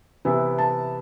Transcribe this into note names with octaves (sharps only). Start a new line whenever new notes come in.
C3 E3 B3 E4
A5